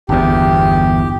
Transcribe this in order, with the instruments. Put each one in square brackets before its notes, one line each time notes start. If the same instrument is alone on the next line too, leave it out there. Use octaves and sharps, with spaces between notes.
[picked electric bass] G1 E2 [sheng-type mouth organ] G4